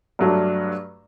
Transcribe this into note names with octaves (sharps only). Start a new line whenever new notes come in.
G2 F#3 A3 D4